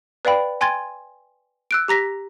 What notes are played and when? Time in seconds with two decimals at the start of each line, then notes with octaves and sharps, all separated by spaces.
0.25 B4 D5 F5 G5 B5
0.61 G5 G#5 C6 G#6 A6
1.71 E6 F#6 D7
1.88 G4 A#5 A#6 B6